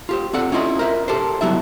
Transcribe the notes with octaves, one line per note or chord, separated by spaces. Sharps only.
F4 G4 C5
C4 F#4 A4 D5 F#5
C#4 E4 F4 D#5
A#4 C5 E5
G4 A4 A#4 C5
F#3 G3 B3 E4 A4 E5